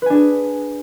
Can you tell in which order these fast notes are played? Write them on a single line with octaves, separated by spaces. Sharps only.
B4 G#5 D4 G#4